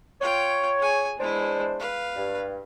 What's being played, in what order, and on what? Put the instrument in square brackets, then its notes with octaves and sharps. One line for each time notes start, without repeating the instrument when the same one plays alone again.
[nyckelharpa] F4 G5 [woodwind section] C#5
[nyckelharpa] G#4 G#5
[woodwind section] E2 D4 C5 [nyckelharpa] G#3 E4
[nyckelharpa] B4 F5
[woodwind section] G2